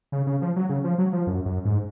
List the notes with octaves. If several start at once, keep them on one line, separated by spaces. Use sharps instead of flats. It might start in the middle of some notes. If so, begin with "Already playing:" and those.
C#3
C#3
F3
F#3
C#3
F3
F#3
F3
F#2
F#2
G#2